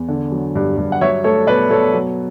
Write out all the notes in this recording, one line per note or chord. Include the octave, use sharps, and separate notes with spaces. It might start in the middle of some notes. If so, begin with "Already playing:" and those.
Already playing: E2
D3
F#3
G2
G2
F#5
F#3 C#5 E5
A3 A4 C#5
B2 B4 D5
B2 A4 C#5
F#3